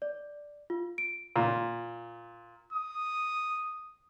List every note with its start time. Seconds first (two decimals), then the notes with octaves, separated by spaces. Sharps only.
0.02 D5
0.70 F4
0.98 D7
1.36 A#2
2.73 D#6